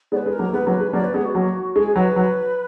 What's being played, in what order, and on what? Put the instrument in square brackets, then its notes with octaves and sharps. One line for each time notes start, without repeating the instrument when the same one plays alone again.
[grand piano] G#3 B3 [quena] D5
[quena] B4
[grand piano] G#3
[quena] A#4
[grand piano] F#3 A#3
[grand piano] G#3 B3 [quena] B4
[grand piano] F#3 A#3
G#3
[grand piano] F#3 A#3 [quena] D5
[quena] B4
[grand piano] G#3 B3 [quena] G#4
[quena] F#4
[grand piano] F#3 A#3
[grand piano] G#3 [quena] G#4
[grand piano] F#3 [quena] B4
[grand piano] F#3